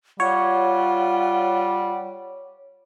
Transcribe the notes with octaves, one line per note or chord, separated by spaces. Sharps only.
G3 F4 C#5 F#5